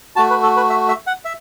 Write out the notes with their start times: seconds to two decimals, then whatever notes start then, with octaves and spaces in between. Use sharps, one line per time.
0.16 A3 F#4 A5
0.30 B4
0.43 A4
0.57 B4
0.70 E5
0.88 E5
1.07 F#5
1.25 E5